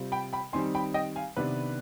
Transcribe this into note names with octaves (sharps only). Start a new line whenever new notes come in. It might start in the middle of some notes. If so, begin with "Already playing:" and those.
Already playing: C3 G3 C4 F4
G5 B5
G5 B5
D#3 G3 C4 D#4 G#5 C6
G5 B5
D#5 G5
F5 G#5
C3 D#3 B3 D4 B4